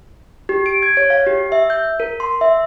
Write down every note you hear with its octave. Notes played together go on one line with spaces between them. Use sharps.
G4
D7
G#6
C#5
F5
G4
E5
G6
A#4
C6
E5